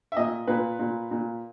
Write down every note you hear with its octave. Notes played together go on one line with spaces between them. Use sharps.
E5
A#2 D#5
A#2 B4
A#2
A#2